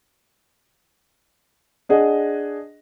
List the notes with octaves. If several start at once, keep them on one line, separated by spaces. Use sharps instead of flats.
D4 G#4 D#5 F#5